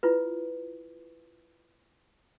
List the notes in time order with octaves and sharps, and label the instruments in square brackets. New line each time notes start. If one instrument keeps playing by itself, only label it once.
[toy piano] E4 F4 B4